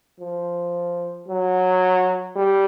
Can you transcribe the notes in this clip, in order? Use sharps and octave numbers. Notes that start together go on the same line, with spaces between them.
F3
F#3
G3